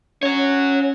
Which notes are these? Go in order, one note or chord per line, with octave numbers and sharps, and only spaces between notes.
C#4 F#4 C#5